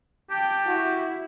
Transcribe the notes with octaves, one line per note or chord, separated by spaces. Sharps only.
G4 G5 A5
E4 F#4